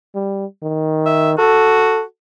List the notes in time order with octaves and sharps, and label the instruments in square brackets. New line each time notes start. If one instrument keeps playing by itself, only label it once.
[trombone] G3
D#3
[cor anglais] E5
[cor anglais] F#4 [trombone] A4